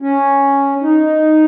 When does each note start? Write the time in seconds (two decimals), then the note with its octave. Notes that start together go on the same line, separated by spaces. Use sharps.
0.02 C#4
0.82 D#4